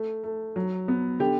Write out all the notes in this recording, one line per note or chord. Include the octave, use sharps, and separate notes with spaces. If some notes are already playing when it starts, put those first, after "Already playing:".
Already playing: A3
A3
F#3
B3
D3 G4